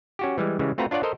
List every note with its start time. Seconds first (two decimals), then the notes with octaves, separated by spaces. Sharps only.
0.19 C#4 F#4 G4
0.38 E3 G3 G#3
0.59 C#3 E3 G3 G#3
0.78 A3 C4 F4 F#4 B4 A#5
0.91 D4 F4 C#5 D5 F#5
1.03 A4 A#4 C5 D#5